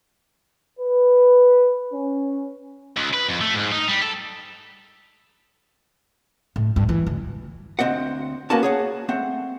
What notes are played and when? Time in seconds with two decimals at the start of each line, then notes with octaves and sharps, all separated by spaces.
0.80 B4
1.93 C#4
2.97 C#2
3.13 B4
3.28 F2
3.41 A3
3.55 G#2
3.72 D#4
3.88 G3
4.02 A4
6.56 A2
6.76 G2
6.89 E3
7.07 D2
7.79 D2 C4 D#5 F#5
8.50 A#3 B3 C#4 F#4 A#4 A5
8.63 G#4 C#5 F#5
9.09 A3 C4 F#5